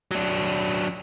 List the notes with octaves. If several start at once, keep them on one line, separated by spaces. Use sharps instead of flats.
F#3 D4